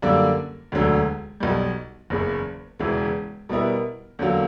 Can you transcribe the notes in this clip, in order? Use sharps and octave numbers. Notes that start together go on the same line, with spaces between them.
F#2 D3 G3 A#3 D4
E1 D2 D3 F#3
B1 B2 G3
F#1 E2 C#3
E1 E2 C#3 E3
B2 G3 B3 E4 A#4
E2 D3 F#3 A#3